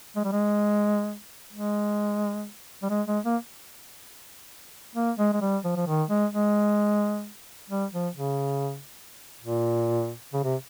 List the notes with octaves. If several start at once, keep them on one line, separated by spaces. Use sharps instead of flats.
G#3
G3
G#3
G#3
G3
G#3
G#3
A#3
A#3
G#3
G#3
G3
F3
F3
D#3
G#3
G#3
G3
F3
C#3
A#2
C#3
C3